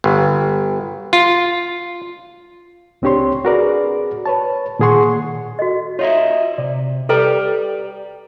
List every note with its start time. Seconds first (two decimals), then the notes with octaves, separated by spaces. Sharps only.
0.04 G1
1.13 F4
3.02 C#2 C4 D4 G4 C#5 C6
3.45 F#4 G#4 A#4 B4 D5
4.26 B4 C#5 A5
4.79 A#2 D#3 G#4 F#5 C6 C#6
5.59 F#4 A4 D#5
5.99 F4 C#5 D#5 E5
6.58 C3 D5
7.09 G4 A4 B4 D5 G5 A#5